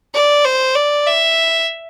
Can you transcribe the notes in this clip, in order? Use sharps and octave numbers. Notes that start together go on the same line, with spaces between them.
D5
C5
D5
E5